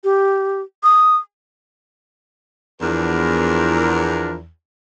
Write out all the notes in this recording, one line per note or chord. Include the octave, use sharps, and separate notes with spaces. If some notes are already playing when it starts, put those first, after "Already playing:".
G4
D#6
E2 F3 D4 A#4